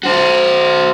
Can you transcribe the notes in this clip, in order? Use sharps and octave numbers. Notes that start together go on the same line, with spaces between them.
F#4 C5